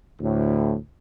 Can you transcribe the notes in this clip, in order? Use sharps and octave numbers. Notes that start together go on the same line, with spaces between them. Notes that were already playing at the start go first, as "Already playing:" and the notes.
D2 A2